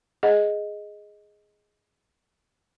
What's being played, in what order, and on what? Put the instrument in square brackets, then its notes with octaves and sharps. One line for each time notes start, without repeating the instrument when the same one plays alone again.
[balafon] G#4 D#5 F#5